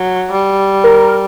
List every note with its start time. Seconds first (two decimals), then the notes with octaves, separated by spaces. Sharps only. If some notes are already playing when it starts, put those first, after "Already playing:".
Already playing: F#3
0.32 G3
0.84 A#4